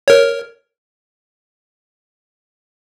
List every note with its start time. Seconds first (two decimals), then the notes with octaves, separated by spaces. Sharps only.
0.08 A#4 C#5